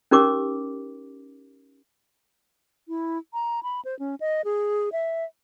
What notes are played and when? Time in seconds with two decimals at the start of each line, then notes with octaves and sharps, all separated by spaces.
0.11 C#4 D#4 G4 A#4 D6
2.88 E4
3.33 A#5
3.63 B5
3.85 C5
3.99 C#4
4.20 D#5
4.44 G#4
4.92 E5